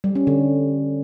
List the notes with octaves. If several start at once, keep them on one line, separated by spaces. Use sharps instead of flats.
G3
C#4
D3